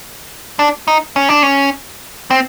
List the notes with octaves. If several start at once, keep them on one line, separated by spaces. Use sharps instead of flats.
D4
D#4
C#4
D4
C#4
C4